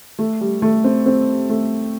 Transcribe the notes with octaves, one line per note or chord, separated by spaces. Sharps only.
A3
G3
A3
C4
C4
A3